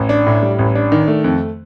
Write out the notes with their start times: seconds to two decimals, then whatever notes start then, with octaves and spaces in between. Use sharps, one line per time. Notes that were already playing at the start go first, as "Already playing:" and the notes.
Already playing: A1
0.09 D4
0.27 A2
0.43 G3
0.59 A1
0.75 D4
0.92 D#3
1.08 A3
1.24 F2